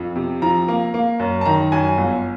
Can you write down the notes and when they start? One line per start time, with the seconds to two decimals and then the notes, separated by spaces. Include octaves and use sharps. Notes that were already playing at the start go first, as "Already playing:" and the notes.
Already playing: F2
0.16 C3
0.42 F3 A#5
0.68 A#3
0.94 A#3
1.20 F#2
1.41 A5
1.45 D#3 A#5
1.72 F#2 G#5
1.98 G1